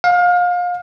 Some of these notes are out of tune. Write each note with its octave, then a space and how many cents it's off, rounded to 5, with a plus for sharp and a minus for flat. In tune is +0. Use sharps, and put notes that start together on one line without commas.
F5 +30